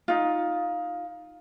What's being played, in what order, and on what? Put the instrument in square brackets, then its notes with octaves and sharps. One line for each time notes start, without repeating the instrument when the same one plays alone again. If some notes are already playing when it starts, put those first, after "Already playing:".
[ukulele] D#4 F4